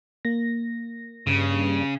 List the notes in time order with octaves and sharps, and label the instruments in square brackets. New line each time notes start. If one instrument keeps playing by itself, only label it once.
[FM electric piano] A#3 A#6
[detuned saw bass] G2 [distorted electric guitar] C#3